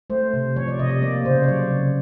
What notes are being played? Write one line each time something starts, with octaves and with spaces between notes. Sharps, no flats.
A3 C5
C3
F3 C#5
D5
C3 D#5
D#5
A#3 D5
C#3 C5
C#5
F#3 D5
C#3